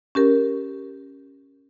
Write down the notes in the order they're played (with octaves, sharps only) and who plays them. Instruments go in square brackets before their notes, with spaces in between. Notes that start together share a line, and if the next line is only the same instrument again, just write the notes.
[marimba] C#4 G4 A#4